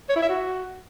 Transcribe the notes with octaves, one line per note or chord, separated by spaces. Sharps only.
C#5
E4
E5
F#4